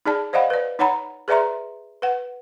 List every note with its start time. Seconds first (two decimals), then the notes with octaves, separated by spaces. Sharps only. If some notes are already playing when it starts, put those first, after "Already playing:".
0.06 D#4 G#4 D5 A5
0.33 C5 D5 D#5 F5 F#5 B5
0.50 B4 D5
0.79 D#4 C#5 F#5 A#5 B5
1.28 G#4 B4 D5 E5 A#5 C6
2.02 B4 F#5